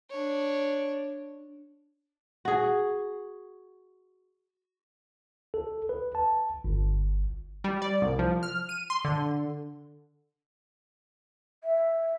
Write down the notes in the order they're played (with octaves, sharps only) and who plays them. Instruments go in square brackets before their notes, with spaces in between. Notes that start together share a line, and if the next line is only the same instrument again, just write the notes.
[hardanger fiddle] D4 C#5
[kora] F#4 G#4
[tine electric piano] A4
B4
A5
G1
[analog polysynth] G3
D5
C2
F3
F6
D#7
C6
D3
[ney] E5